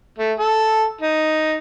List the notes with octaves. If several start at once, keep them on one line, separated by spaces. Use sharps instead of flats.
A3
A4
D#4